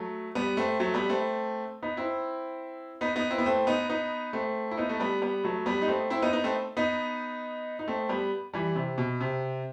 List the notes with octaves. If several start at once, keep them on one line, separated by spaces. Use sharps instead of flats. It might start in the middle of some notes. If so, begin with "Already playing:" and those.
Already playing: F#3 A3
G3 B3
A3 C4
F#3 A3
G3 B3
A3 C4
B3 D#4
C4 E4
B3 D#4
B3 D#4
C4 E4
B3
A3 C4
B3 D#4
B3 D#4
A3 C4
E4
B3 D#4
A3
G3 B3
G3 B3
F#3 A3
G3 B3
D#4
A3 C4
C4 E4
B3 D#4
B3 D#4
A3 C4
B3 D#4
D#4
A3 C4
G3 B3
E3 G3
C3
B2
C3